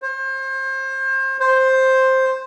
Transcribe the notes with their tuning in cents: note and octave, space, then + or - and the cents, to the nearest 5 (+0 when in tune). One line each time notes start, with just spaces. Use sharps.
C5 +30
C5 +5